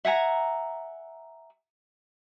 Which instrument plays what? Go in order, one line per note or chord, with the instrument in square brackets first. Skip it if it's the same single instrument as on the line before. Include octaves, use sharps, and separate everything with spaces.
[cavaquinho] E5 F#5 G#5 A#5